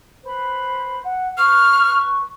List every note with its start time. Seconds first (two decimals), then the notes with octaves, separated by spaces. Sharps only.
0.24 B4 C5 B5
1.04 F#5
1.38 B4 C#6 F6